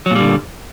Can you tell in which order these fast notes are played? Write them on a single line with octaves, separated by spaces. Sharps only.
F#3 A#2 G3 D3